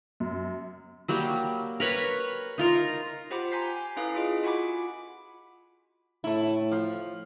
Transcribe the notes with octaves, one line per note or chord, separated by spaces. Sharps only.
F#2
F#3 G3 A#3 G4
A#4 B4 C#5
D#4 F4 A#4
F4 G4 C5 F#5 B5 D6
G#5 A#5 C6 G6 B6 C7
G#5
C#4 E4 A4 B4 F5 D#6
E4 F4 G#4 D#5
F4 F#4 F#5 G#5 B5 D6
A2 A3 E4
F3